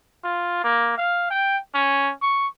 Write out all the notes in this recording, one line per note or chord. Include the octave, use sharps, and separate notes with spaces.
F4
A#3
F5
G5
C#4
C#6